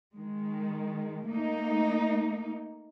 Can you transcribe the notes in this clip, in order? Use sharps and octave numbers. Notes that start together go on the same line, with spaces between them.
D#3 G#3
A3 A#3 D#4